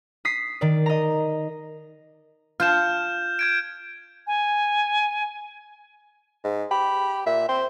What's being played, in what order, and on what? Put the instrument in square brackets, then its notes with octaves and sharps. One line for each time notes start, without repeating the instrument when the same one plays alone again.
[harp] D#6 B6 C7
D#3 D5
D#5 A#5
[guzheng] F4 A5 [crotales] F6 G6 E7
[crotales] G6 G#6 D7
[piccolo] G#5
[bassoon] G#2
[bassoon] G4 [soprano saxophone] B5
[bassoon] A#2 [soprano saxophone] E5
[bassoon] C4 [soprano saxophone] C5